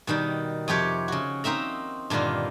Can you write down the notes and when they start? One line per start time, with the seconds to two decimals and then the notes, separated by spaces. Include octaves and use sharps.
0.07 B2 D#3 G3 D#4
0.68 F2 C3 G4 C#5
1.08 C#3 F#4
1.44 A#3 C4 D#4 E5 A#5
2.10 G2 A#2 D3 D#3 F4